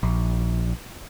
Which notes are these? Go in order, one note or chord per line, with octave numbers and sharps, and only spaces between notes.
A#1